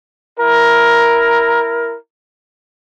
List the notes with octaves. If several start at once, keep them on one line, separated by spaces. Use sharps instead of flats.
E4 A#4